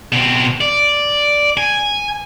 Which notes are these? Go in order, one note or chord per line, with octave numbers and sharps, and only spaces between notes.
B2 C4
D5
G#5